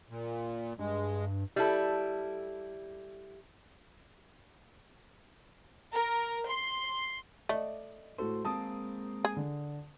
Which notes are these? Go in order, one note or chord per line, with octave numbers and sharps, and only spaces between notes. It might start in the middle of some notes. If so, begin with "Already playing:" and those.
A#2
G2 G#3
G3 E4 A4
A#4
C6
A3 D5 D#5
A2 F#4 A4 C5
G#3 A#3 C4 A5 D#6
G#4
D3